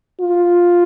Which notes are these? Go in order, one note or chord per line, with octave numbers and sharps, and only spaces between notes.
F4